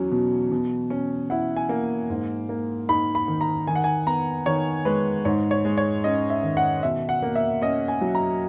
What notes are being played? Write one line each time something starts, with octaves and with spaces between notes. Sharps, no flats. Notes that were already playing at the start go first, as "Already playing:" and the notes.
Already playing: E2 F#3 C#4
B2
B2
C#4
E4 F#5
G#5
A#3
G#2
A#3
D#4 B5
B5
D#3
A#5
D#3 G#5
F#5
G#5
B3 A#5
D#3 C#5
G#3 B4
G#2 C#5
C#5
G#3
C#5
C#4 D#5
E5
D#3
F#5
B2 E5
F#5
A#3
E5
C#4 D#5
G#5
F#3
A#5